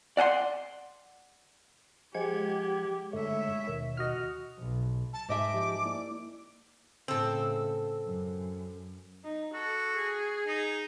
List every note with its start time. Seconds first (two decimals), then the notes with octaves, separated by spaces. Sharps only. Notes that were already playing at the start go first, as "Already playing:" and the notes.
0.17 D5 F#5 G#5 C6
2.15 F3 G#3 G4 F#5 G#6
3.13 G2 D3 A3 C#5 E5
3.67 D#2 B2 D#3
3.97 F#4 D#5 F6
4.59 B1
5.13 A5
5.29 G#2 D#5 E5 D6
5.54 F3 G4 A5
5.85 A#3 E4 D5
7.08 A2 C#3 C4 A4
8.05 F#2
9.24 D#4
9.54 F#4 A4
9.96 G#4
10.47 D#4